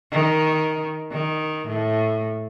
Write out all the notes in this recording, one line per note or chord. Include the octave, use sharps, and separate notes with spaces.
D#3
D#3
A2